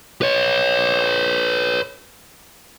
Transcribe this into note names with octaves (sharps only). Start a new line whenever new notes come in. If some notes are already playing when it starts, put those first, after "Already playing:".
B4 C#5